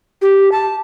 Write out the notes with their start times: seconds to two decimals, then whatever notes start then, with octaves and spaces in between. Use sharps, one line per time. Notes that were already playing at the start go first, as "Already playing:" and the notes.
0.22 G4
0.52 A5